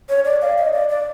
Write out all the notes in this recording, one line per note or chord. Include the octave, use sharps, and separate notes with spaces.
C#5
D5
F5
D#5
D5
D5